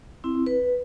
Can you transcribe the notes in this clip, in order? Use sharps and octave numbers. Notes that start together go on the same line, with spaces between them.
C4 E4
B4